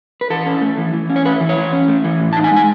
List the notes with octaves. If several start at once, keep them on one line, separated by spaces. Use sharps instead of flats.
B4
E3 A4
C#4
A3
E3
E3
C#4
C#5
A3 B4
E3
C#5
E3
C#4
A3
E3
A2
A5
D#4
G#5
G#3
G#5